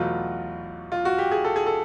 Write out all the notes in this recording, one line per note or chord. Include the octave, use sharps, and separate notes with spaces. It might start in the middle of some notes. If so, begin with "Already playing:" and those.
Already playing: E2 B2 F#3 A3 F4
F4
F#4
G4
G#4
A4
G#4
A4